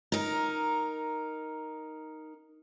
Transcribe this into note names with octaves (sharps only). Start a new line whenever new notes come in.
D#4 A#4